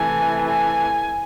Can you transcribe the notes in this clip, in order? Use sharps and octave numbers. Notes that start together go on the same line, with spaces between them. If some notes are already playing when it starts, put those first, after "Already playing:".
Already playing: C3 E3 A3 G#5
G#5